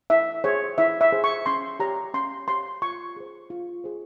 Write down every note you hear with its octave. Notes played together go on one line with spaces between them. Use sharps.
E4 E5
G#4 C5 C#5
E4 E5
E5
G#4 C5
C#6
C#4 C6
G4 C#5 A#5
C#4 C6
G4 C#5 C6
F4 C#6
G#4 C5
F4
G#4 C5